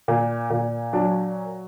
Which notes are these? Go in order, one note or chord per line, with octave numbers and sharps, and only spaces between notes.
A#2
A#2
F#3 D4